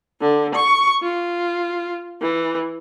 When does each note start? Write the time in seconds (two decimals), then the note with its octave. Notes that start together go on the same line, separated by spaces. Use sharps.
0.21 D3
0.55 C#6
1.02 F4
2.22 E3